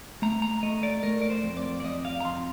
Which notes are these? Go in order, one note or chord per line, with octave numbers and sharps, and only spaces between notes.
A3 A#5
A#5
A3 D#5
D5
A3 A#4
D5
C5
F2
D5
D5
F2 D#5
F5
A#5
F2 C6